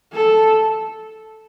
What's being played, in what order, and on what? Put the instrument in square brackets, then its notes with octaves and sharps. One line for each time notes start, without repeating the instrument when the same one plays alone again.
[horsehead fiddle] A4